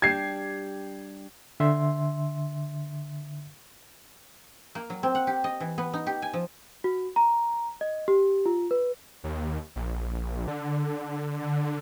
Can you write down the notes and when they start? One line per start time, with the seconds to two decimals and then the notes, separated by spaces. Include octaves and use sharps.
0.02 G3 D4 G4 G#6 C7
1.60 D3 E5 C6
4.75 A#3
4.90 F#3
5.03 C4
5.15 F#5
5.27 G4
5.44 D#5
5.60 E3
5.78 B3
5.93 D#4
6.07 G4
6.22 G#5
6.33 F3
6.84 F#4
7.16 A#5
7.81 D#5
8.08 G4
8.46 F4
8.71 B4
9.24 D#2
9.76 A#1
10.48 D3